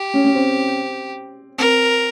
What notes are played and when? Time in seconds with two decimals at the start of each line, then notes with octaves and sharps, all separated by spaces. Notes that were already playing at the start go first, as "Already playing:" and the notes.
Already playing: G4
0.14 C#4
0.24 C#4
0.35 C4
1.58 C4 A#4